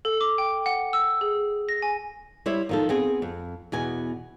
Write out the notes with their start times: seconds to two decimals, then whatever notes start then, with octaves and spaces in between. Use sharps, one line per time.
0.05 A4
0.21 D6
0.38 G5
0.66 F#5
0.93 E6
1.21 G#4
1.69 A#6
1.82 G#5
2.46 G3 E4 C5 C#5 E5
2.69 D#3 F3 A4
2.89 B3 C4 G#4
3.22 F2
3.72 E2 B2 G#5